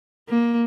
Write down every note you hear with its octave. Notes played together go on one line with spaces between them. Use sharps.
A#3